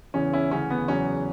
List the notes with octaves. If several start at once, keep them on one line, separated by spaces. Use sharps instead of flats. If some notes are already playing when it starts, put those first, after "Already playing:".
E2 C#3 E3 C#4
C#4 E4
D2 C#3 E3 C#4
B3
E2 C#3 F#3 C#4